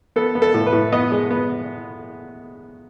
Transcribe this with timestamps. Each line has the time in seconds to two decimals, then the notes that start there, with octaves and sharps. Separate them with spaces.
0.16 B3 A4
0.35 B3
0.42 A4
0.54 A2
0.66 B4
0.73 A2
0.92 B3 D#5
1.12 G#3
1.31 B3